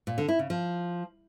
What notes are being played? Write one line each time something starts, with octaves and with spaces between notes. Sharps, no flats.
A#2
D3
E4
C#3
F3